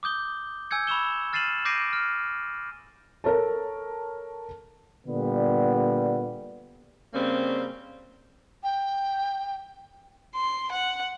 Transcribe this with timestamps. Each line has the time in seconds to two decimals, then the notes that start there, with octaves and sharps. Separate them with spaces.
0.03 D6 D#6 G6 G7
0.71 G#5 E6 G6 G#6 C#7
0.87 B5 C#6 E6 E7 G7
1.33 F6 A6 C7 D#7 E7 F#7
1.65 D6 G6 A#6 C7 D7 D#7
1.93 F6
3.24 A4 A#4 C#5 A5
5.06 A#2 D3 G3 B3
7.13 C#3 G3 A#3 C4 C#4
8.64 G5
10.36 C6
10.72 F#5